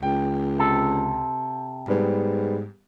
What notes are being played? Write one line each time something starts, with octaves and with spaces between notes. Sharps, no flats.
C#2 G5
C3 A4
G#2 G3 B3